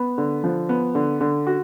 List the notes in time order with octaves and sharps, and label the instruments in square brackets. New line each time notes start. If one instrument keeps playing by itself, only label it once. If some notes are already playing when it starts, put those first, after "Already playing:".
Already playing: [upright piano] B3
D3
F3
B3
D3
D3
F#4